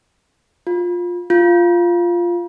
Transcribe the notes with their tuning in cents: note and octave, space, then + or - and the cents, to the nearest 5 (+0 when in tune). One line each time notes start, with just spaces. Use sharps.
F4 +15
F4 -5